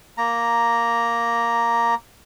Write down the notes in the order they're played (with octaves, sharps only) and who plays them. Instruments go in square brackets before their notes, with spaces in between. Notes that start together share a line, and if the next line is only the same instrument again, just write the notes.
[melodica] A#3 A#5